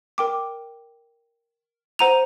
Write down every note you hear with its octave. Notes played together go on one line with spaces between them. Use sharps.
A#4 G5 D6
C5 F#5 A#5 D#7 F7